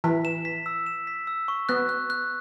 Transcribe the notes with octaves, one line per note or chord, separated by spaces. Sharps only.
E3 B6
E7
B6
E6
E7
B6
E6
C#6
B3 F#6
F#6
F#6